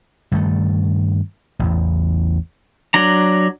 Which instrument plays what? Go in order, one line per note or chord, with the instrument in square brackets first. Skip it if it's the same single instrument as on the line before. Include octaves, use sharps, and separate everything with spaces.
[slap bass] G2 D#3 A3
A1 E2
[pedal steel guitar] F#3 D4 A#5